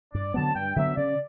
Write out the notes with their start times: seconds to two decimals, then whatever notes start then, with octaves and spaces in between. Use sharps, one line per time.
0.14 G2 D5
0.34 D3 F#3 B3 A5
0.55 G2 G5
0.76 D3 F#3 B3 E5
0.97 C#3 D5